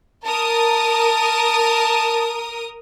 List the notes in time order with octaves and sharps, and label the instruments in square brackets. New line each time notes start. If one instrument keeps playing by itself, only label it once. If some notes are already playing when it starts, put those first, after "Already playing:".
[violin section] A#4 D#6 [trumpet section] A5